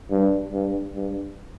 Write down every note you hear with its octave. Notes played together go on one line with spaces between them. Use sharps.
G2
G2
G2